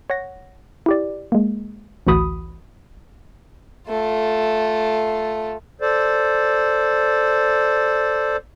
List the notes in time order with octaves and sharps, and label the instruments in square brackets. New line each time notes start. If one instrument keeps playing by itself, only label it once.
[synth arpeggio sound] C#5 F#5 A#6
E4 G4 D5
G#3 A#3
A1 D2 E3 F#4 B5 D#6
[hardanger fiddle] A3 F4
[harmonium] A4 C5 D5